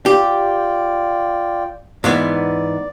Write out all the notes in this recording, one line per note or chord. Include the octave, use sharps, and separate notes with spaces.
F4 G4 D5 G5
G#2 E3 B3 D5